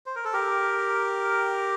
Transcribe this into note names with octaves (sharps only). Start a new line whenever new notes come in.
C5
A#4
A4
G4 A#4